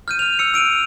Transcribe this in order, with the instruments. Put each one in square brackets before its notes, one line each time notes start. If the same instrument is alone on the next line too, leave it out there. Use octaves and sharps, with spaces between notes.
[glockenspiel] F6 G6 D#7
F6 F7
E6 C#7
E6 D7 D#7 F7